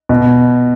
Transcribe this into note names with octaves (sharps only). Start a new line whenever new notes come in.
B2